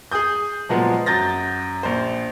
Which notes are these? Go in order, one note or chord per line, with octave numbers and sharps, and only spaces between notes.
G#4 G#5 D#6 G6
A#2 F3 F#3 G#3 B3
F#2 F#3 G6 A6 A#6
A#1 C5